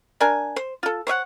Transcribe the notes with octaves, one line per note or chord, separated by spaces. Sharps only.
D4 A#4 G#5
C5
F4 A4
C5 C#5 E5 F#5